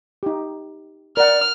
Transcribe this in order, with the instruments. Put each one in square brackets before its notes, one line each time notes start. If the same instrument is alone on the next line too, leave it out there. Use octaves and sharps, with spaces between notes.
[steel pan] D#4 G4
[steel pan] A#4 F#5 [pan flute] D5 [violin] F6